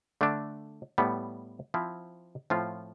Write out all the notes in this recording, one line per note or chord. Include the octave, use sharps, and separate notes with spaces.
D3 A3 D4
A2 G3 B3
F3 C4 E4
A2 F3 C4 F4